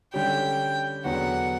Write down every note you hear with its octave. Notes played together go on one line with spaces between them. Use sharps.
D3 G3 C#4 G4 G5
E2 D3 F#3 B3 F#4 F#5